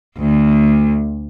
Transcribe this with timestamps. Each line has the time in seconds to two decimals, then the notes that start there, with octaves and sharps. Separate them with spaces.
0.19 D2